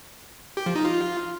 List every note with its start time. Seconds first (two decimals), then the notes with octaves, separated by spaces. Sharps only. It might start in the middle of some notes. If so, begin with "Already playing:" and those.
0.57 G4
0.66 F3
0.75 D#4
0.85 F4